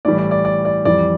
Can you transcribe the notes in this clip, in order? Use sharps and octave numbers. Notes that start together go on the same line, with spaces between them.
A2 E3 G3 D5
D5
D5
D5
D5
F2 E3 G3 D5